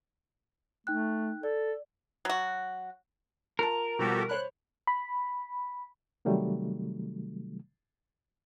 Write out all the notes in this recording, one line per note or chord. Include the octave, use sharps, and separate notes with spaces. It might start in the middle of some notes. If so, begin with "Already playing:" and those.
A3 D#4 G5 F#6
A4 D5
F#3 F#4
F4 A#4 A5
B2 F3 G3 F#4 G4 A4
C5 C#5 B5 F#6
B5
C3 D#3 F#3 G3 A3